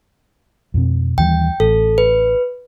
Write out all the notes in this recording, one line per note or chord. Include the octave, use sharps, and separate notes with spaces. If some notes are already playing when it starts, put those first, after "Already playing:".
F2 B2 C4
D#2 E3 G3 G5
A1 A4
B4